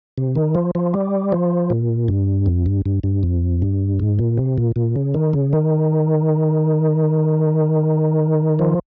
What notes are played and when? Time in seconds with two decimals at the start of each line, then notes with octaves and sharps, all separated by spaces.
0.18 C3
0.35 D#3
0.55 F3
0.75 F3
0.94 G3
1.32 F3
1.70 A#2
2.08 G2
2.46 F2
2.66 G2
2.86 G2
3.03 G2
3.23 F2
3.62 G2
4.00 G#2
4.19 A#2
4.37 C3
4.58 A#2
4.76 A#2
4.96 C#3
5.14 D#3
5.33 C#3
5.53 D#3
8.59 F3